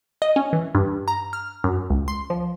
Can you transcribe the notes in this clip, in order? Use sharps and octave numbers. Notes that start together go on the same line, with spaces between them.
D#5
C#4
E3
G2
A#5
F6
F#2
C#2
C6
F3